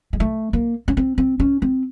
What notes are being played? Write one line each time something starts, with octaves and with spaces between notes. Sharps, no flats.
G#3
A3
A#3
C#4
C4
C4
C#4
C4